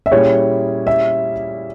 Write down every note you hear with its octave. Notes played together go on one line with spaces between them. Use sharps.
E5
A#2 G3 C#4 E4 G#4 C#5
E5